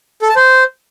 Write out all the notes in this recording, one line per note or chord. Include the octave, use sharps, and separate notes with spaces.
A4
A5
C5